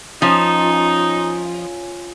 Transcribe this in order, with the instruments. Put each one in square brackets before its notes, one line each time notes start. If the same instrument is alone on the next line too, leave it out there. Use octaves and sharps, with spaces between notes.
[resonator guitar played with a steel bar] F3 [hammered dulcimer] C#4 F4 [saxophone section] D#4